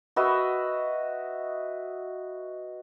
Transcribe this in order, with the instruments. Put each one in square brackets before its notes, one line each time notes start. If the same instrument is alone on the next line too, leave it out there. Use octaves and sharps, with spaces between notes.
[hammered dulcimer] F#4 B4 D#5 E5